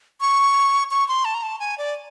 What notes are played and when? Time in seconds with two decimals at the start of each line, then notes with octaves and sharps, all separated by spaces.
0.21 C#6
0.91 C#6
1.08 C6
1.25 A5
1.34 A#5
1.43 A5
1.60 G#5
1.78 D5